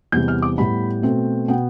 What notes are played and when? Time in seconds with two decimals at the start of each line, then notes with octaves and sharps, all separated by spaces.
0.12 E2 C3 G3 G6
0.28 F6
0.42 D6
0.57 A2 G3 B3 B5
1.02 B2 A3 C4
1.48 B2 B3 G5